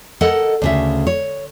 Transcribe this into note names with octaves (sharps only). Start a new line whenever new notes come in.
A4 A#4 D#5 F#5
D2 C#3 E5
C#5